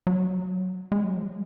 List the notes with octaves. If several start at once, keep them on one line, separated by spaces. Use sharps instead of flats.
F#3
G#3
F#3
F3